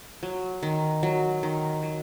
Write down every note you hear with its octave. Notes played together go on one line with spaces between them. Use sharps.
F#3
D#3
F#3
D#3
F#3